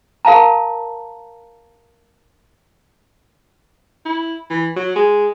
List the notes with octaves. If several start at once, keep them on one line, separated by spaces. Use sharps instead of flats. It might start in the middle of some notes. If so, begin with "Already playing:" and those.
A#4 F5 A5 A#5
E4
E3
F#3
G#3